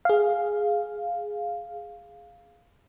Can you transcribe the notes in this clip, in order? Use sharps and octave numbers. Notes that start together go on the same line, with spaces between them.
G#4 F5